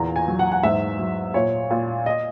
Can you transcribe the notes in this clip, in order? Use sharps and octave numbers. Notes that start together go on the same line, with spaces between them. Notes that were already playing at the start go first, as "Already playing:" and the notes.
Already playing: E2 A#2 A#5
G#5
F#3
F#5
F#5
G#2 E5
F#3
A#2 C#5
A#2
D#5